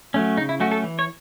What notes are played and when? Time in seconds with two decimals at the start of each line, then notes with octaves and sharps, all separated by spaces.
0.14 F#3 A3 C#4
0.37 C#3 D#4
0.49 E4
0.60 F#3 A3 C#4 F#4
0.72 A4
0.84 E3
0.99 C#5